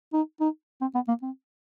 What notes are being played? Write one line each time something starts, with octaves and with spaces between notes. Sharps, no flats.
D#4
D#4
C4
B3
A#3
C4